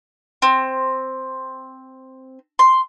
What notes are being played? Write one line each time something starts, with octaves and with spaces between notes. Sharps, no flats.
C4
C6